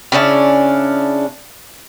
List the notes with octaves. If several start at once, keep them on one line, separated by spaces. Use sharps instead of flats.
C#3 C#4 D4 E4